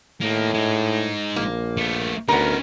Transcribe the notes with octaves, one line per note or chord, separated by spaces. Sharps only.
A2 A#3 D#4
G#3 D#4
A#1 A#3
A3 B3
D2 B3 C#4 D#4 A#4